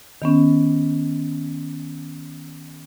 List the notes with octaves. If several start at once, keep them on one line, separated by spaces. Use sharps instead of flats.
D#3 B3 C#4